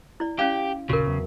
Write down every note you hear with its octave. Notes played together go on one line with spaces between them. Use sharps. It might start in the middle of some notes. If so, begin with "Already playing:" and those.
E4 D5
C#4 G4 D5 F5
G#1 D#2 A#2 C#3 F#4 A#4
E2 F#3